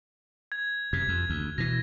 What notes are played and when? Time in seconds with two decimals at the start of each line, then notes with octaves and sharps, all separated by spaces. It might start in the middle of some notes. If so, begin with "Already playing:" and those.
0.52 G#6
0.93 F#2 C3 G#6
1.08 F2
1.30 D2
1.58 B2 E3 A#6